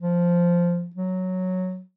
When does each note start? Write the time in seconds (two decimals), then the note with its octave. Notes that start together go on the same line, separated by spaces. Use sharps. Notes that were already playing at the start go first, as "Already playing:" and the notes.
0.01 F3
0.96 F#3